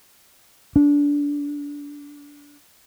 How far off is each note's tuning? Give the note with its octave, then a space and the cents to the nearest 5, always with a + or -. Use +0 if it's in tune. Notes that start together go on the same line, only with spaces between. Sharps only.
D4 -20